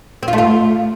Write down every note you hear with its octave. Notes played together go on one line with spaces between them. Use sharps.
C4
F4
A3
F4